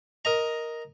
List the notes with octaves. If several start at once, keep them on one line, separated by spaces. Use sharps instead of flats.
A#4 D#5 A#5